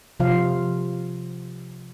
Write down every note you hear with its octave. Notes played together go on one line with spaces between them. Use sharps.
C3 F3 F4 F5